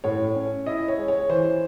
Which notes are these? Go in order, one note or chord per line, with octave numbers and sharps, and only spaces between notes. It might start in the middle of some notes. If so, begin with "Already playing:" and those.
A2 C#5
C#4
E4 D#5
C#5
G#3
C#5
E3 C5
C5